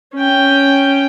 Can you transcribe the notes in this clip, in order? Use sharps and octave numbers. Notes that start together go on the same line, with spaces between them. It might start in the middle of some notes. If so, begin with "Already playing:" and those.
C#4 G5